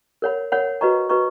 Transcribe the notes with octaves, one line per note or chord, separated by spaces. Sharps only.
A#4 C#5 F#5 B5
A#4 C#5 F#5 B5
F#4 B4 D#5 A#5 C#6
F#4 B4 D#5 A#5 C#6